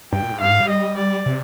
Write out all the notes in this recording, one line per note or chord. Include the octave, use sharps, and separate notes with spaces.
G2 G5
A#2
G#2
G2 F5
G#2
G3
D#5
D5
C3